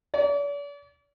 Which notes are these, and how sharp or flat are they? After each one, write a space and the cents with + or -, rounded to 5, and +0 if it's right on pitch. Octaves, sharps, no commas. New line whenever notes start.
D5 -45